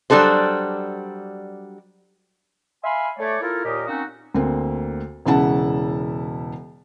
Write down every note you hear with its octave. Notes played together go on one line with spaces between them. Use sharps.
F#3 G3 D4 A4 C5
E5 F5 G#5 B5 C6
A3 C#5 D5
A#3 E4 F4 A4 A#4
D#2 A#2 G4 A#4 D#5
A#3 C4 C#4 D#4 F#4
D2 A#3 C4
E1 C#3 C#4 E4 F#5 A5